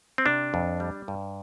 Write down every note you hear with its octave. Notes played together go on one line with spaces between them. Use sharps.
C4
C3 D4
F2
G3
G2